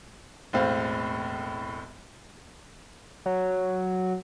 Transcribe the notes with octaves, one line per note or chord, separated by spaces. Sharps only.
E1 A2 C4 F5
F#3